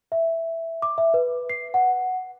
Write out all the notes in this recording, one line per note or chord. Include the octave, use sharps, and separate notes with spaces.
E5
D6
E5
B4
C7
F#5